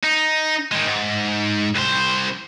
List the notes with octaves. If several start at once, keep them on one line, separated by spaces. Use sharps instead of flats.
D#4
D#3 G#3
G#2
C2 C5